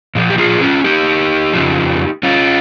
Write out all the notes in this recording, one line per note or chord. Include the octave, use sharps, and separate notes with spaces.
A#2 F3
G4
F4 G#4
C#4 F4
D#4 G4
F2 C#3 F3
C#4 F4